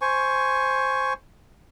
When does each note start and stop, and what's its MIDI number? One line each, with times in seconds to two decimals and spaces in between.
0.01 1.13 72
0.01 1.13 80
0.01 1.13 85